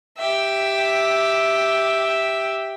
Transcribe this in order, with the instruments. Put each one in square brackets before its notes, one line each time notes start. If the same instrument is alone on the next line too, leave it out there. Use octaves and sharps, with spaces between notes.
[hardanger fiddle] G4 E5